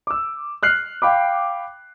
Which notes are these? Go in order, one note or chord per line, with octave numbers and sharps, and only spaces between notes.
D6 E6
F6 F#6 C7
F5 G5 B5 D6